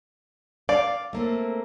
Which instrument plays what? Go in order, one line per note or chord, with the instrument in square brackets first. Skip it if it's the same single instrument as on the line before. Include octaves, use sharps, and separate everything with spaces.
[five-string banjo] D5 [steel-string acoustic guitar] F5
[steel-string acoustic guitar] A3 A#3 C4